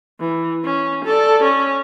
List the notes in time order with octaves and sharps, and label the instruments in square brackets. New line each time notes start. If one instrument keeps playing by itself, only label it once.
[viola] E3
C#4
A4 D5
C#4